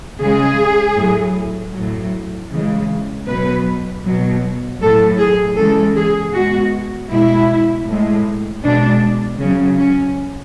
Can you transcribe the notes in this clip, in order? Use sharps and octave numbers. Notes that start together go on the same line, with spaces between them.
C#3 G#3 G#4
A2 F#3
A2 F#3
C#3 E3 G#3
B2 F#3 B4
B2 F#3
A2 F#3 A4
G#4
C#3 E3 G#3 A4
G#4
B2 G#3 F#4
B2 G#3 E4
A2 G#3
B2 G#3 D4
C#3 F#3 C#4
C#4